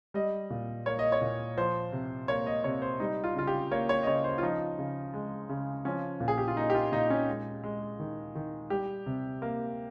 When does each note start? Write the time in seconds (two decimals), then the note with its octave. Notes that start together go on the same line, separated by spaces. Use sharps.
0.14 G3 D#5
0.50 A#2
0.86 A#3 C#5
0.99 D#5
1.12 C#5
1.22 A#2
1.57 F3 C5
1.92 C3
2.28 A#3 C#5
2.46 D#5
2.64 C3 C#5
2.82 C5
3.00 G3 D#4
3.24 F4
3.35 C#3 F4
3.47 G4
3.71 A#3 C#5
3.89 C#5
4.03 D#5
4.07 C#3 C#5
4.24 C5
4.38 F4
4.42 F3 D#4
4.78 C#3
5.14 G#3
5.49 C#3
5.85 F3 C#4
6.20 A#2
6.28 G#4
6.38 G4
6.48 F4
6.57 A#3 D#4
6.70 G4
6.74 F4
6.92 A#2 D#4
7.10 C#4
7.28 G#3
7.63 G#3
8.00 D#3
8.35 D#3
8.70 G3 G4
9.06 C3
9.42 A#3